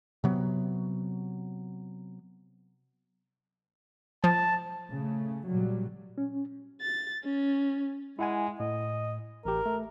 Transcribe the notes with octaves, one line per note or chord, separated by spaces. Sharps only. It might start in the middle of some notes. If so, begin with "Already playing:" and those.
C3 F#3 B3
F3 A5
A#2 C#3 A3
A#2 C#3 F#3 G3
C#4
A6
C#4
G#3 E4 F#5 G#5
A2 D#5
A1 G4 A#4
A3